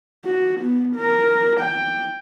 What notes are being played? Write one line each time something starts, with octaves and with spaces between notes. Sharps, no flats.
F#4
B3
A#4
G5